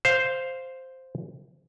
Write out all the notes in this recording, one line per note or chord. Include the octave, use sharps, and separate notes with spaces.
C5 F5